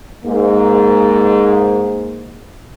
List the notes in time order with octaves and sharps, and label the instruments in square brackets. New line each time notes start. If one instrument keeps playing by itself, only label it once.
[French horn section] G#2 A#3